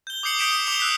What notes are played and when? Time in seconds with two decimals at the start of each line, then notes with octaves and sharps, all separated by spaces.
0.07 G6 G7
0.23 D6 D#6 G6 C7 C#7 F#7
0.38 D#6 G6 B6 D7 E7 G7
0.51 D#6 G6 C#7
0.66 D6 C7 E7 F7 G7
0.80 E6 F#6 B6